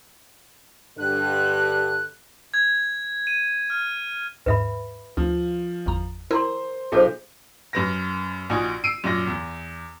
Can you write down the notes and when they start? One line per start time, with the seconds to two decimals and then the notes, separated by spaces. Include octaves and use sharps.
0.98 G2 D3 F#6
2.54 G#6
3.27 D#7
3.70 F6
4.46 D#2 G#2 B4 E5 B5
5.17 D2 F3
5.86 G1 E2 A#5
6.31 E4 A#4 C5 A#5 C6
6.92 B1 F4 G#4 A4 C5 G6
7.73 F#2 B4 A#6
8.49 A#1 A#2 D#4 F#4 G#5
8.84 E6 C7 D7 D#7
9.04 F#2 A#2 D5 A#6
9.27 E2